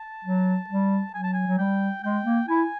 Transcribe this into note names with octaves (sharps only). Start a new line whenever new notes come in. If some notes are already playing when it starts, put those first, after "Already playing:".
Already playing: A5
F#3
G3
F#3 G#5
A5
G#5
F#3
G3 G5
G#3 G5
A#3
E4 G#5